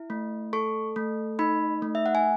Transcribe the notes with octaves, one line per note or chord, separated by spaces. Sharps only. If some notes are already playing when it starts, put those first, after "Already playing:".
Already playing: E4
A3
A4 C#6
A3
D#4 B5
A3
E5
F#5
G#5